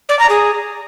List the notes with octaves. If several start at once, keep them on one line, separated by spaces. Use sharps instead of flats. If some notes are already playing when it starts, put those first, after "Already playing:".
D5
A#5
G#4